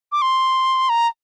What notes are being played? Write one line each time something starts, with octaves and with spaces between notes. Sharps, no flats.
D6
C6
A#5